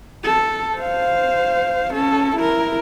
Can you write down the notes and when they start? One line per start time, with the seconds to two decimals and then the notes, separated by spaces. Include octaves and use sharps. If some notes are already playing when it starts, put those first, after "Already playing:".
0.24 A4
0.77 C5 F5
1.93 C#4 A4
2.36 E4 A#4